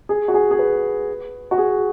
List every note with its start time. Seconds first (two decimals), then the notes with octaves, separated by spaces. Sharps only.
0.09 G#4
0.28 F#4
0.34 G#4
0.51 G#4
0.59 B4
1.51 F#4
1.58 G#4